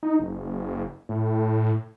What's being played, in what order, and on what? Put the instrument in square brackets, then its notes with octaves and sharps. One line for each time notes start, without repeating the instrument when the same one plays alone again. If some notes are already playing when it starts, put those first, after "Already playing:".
[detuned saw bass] D#4
F#1
A2